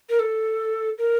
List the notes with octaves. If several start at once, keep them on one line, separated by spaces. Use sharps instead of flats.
A#4
A4
A#4